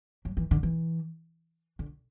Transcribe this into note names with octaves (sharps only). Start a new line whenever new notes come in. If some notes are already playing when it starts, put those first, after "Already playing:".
F#3
E3
D3
E3
D3